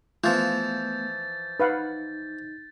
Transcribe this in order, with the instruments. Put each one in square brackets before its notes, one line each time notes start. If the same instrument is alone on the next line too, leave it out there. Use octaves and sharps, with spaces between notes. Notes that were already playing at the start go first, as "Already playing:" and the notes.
[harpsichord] E3 F3 [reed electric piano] A3 B3 [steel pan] F4 [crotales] G6 A6
[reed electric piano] D#4 [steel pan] B4 F5 F#5